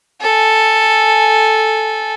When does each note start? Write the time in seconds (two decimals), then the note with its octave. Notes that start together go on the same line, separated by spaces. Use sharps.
0.21 A4 G#5